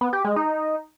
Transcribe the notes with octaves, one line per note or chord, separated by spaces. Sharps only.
B3
G4
G#3
D#4